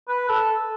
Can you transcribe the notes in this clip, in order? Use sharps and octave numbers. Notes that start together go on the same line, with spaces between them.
B4
A4